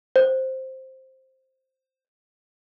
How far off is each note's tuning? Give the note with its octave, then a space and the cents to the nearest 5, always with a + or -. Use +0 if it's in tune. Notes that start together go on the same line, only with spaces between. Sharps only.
C5 +5